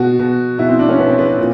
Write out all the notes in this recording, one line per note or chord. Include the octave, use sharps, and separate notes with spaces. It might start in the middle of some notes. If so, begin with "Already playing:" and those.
Already playing: B2 F#4
B2
B2 E4
C4
D4
C#4
B2 B3
C4
B3
C4
A#2